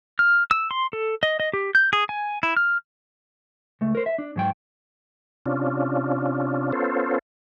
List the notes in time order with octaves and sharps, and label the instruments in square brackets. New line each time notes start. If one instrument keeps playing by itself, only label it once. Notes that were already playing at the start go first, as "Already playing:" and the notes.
[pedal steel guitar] F6
E6
C6
A4
D#5
D#5
G4
G6
G#4
G#5
E4
F6
[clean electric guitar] C#2 A3
A#4 C5
E5
D4
G#2 F#3 G5
[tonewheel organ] C3 C#4 D4 F4
B3 C#4 F4 A4 C5